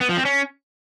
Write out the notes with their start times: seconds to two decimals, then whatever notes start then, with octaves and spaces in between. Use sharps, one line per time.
0.01 B3
0.09 F3
0.17 C4
0.25 C#4